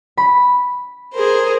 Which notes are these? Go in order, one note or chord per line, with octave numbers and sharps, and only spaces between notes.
B5
G#4 A#4 C5